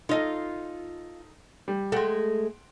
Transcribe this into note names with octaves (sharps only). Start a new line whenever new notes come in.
D#4 F4 A4 D#5
G3
G#3 A3 F#5 G5 C6